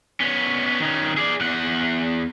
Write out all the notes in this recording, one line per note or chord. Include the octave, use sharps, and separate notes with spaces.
B3 C#4
D#3 C#4
G#4 D5
E2 F#5